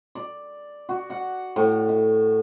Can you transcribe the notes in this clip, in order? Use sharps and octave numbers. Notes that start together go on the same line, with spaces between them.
D5
F#4
F#5
A2
E5